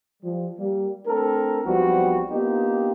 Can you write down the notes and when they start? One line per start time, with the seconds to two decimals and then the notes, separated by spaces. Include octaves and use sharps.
0.23 F3 G3
0.58 G3 A#3
1.07 A3 C4 D4 A4 A#4
1.64 B1 F3 G3 B3 C4 F#4
2.30 A#3 B3 D4 D#4 F4 G4